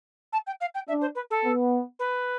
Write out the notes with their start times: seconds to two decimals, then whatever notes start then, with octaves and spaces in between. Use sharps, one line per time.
0.33 A5
0.47 G5
0.61 F5
0.75 G5
0.88 D4 E5
1.01 C5
1.15 B4
1.31 A4
1.44 B3
1.99 B4